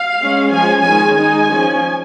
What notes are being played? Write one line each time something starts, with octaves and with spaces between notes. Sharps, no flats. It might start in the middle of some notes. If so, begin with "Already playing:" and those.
Already playing: F5
G#3 C#4
F3 G#3 C#4 G#5
D#3 G#3 C#4 G#5
G#3 D#4 G#5
F3 C#4